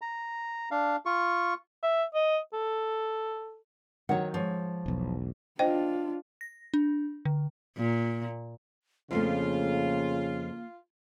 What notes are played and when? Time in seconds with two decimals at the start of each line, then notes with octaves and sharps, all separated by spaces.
0.02 A#5
0.71 D4 F5
1.06 F4 C#6
1.83 E5
2.15 D#5
2.53 A4
4.09 D#3 F#3 C#5 F#5
4.34 G#2 F3 C#5
4.86 E1 B1
5.59 D4 F4 C5 D#5 G5
6.41 A#6
6.74 D4
7.25 D3
7.77 A#2
9.11 F2 C#3 F3 A3 A#3 F4